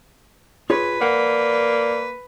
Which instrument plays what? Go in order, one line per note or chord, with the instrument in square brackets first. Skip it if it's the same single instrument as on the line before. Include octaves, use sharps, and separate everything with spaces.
[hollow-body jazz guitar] F4 G#4 C#5 [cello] B4
[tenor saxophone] A#3 [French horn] D5 [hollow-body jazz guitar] F#5